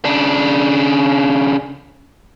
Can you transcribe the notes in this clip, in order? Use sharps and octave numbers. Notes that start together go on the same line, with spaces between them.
C#3 D4